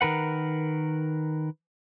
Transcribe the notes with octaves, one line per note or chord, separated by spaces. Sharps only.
D#3 A#4 B4 F#5